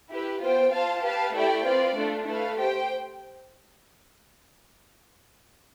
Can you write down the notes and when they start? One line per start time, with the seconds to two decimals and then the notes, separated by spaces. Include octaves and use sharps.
0.11 E4 G4 B4
0.42 B3 F4 C5 G5
0.73 F4 C5 F5 A5
1.04 G4 B4 F5 A5
1.34 A3 E4 G4 D5 G5
1.65 C4 F4 B4 D5
1.96 A3 D4 F4
2.27 A3 E4 B4 F5
2.57 G4 C5 G5